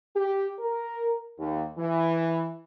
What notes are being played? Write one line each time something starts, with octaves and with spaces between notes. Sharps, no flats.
G4
A#4
D#2
E3